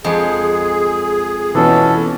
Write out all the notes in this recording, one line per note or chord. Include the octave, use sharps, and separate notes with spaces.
F2 G#3 G#4
B2 E3 C#4 A4